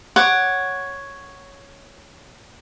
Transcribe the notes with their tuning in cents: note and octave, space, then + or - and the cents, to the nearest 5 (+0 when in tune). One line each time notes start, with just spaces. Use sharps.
C#5 +0 F#5 +0 D6 +10